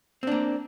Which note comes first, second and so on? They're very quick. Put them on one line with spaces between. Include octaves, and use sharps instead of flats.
C4 D4 A#3